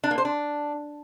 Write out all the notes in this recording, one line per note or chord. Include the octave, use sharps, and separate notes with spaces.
D4
A#3
C5
D4